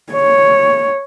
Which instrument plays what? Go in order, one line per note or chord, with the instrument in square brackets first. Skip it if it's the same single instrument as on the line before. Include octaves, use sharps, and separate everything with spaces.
[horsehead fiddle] C#5